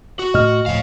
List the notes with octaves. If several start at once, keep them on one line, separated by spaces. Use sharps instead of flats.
F#4
A2 D#5 F6
D2 A2 F3 C#5 F5